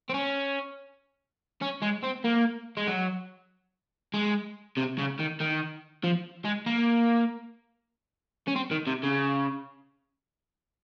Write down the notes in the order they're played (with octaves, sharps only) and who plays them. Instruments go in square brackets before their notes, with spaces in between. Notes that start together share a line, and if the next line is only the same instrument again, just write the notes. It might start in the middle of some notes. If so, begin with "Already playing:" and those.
[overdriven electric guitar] C4
C#4
C#4
G#3
C4
A#3
G#3
F#3
G#3
C3
C#3
D#3
D#3
F3
G#3
A#3
C#4
C4
D#3
C3
C#3